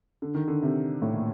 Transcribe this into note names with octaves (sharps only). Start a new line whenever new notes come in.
D3
D#3
D3
C3
A2
A#2